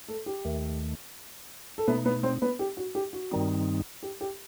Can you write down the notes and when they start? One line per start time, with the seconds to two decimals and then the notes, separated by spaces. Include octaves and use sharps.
0.08 A3 A4
0.26 G4
0.45 D#2 D#3 A3
1.78 A4
1.88 B2 A3 B3 D#4 B4
2.05 B3 B4
2.23 C4 C5
2.42 B3 B4
2.59 G4
2.77 F#4
2.95 G4
3.13 F#4
3.31 G2 D#3 G3 C4 D#4
4.03 G4
4.21 G4